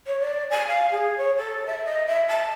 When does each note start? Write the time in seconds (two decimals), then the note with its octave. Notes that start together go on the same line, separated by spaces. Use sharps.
0.07 C#5
0.21 D5
0.51 G#5
0.68 F5
0.91 G#4
1.18 C#5
1.37 A4
1.66 E5
1.85 D#5
2.07 E5
2.28 A5